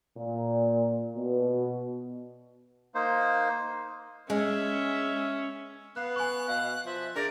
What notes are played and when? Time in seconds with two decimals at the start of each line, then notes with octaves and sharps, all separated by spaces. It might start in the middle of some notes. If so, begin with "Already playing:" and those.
0.18 A#2
1.16 B2
2.95 A#3 D#4 C5
4.30 G#3 C#4 E5
5.96 B3 F5 F#6
6.16 G#5 C#6 F#6
6.48 B2 F5
6.86 F3 E5
7.16 D4 G#4 A#4 D5 A#6